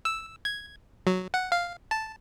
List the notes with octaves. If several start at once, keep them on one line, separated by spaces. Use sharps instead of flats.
E6
G#6
F#3
F#5
F5
A5